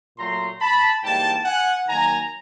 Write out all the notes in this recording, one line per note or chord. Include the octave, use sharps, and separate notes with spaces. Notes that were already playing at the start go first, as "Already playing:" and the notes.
A#2 F#3 A3 A#5 C6
A5 B5
G#2 E3 G3 A#3 G5 A5
F#5 G#5
D#3 F#3 A#3 G#5 A#5